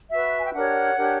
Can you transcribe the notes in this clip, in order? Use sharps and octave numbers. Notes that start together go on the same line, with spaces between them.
F#4 B4 E5
G#5
G5
D4 G4 A#4 C#5 F#5
D4 G4 A#4 C#5